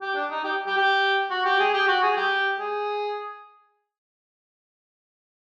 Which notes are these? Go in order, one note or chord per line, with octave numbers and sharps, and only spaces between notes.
G4
D4
D#4
G4
G4
G4
F#4
G4
G#4
G4
F#4
G#4
G4
G#4